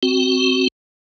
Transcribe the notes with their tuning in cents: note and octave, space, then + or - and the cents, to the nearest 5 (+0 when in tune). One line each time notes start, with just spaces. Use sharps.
C4 +0 F#4 +10